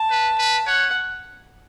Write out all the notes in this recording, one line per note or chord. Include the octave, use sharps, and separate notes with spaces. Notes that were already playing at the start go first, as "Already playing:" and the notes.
Already playing: A5
B4
B4
C#5 F#5